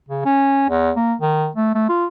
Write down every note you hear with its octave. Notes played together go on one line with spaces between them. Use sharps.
C#3
C#4
E2
A#3
D#3
A3
A3
F4